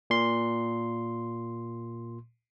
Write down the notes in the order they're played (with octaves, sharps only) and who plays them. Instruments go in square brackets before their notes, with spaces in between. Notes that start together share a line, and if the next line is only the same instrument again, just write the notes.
[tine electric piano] A#2 C6